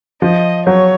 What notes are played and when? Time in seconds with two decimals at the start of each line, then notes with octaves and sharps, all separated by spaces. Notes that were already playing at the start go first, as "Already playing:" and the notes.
0.22 F3 D#5
0.66 F#3 C#5